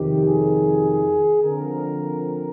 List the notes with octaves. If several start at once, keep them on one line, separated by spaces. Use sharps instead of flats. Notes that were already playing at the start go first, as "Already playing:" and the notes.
Already playing: F2 C3 D#3 G4
G#4
D3 F3 C4 A#4